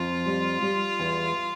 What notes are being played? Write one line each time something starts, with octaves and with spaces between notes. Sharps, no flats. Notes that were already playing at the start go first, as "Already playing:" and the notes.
Already playing: F2 F4
G3
G3
E2